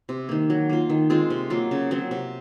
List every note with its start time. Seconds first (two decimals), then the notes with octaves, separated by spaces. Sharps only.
0.09 C3
0.29 D#3 A#3
0.50 F#3
0.69 A#3 F4
0.89 D#3
1.10 G#3 C4 F4
1.30 C3
1.50 F#3 A#3 F4
1.71 C#3
1.91 F#3 C4
2.11 C3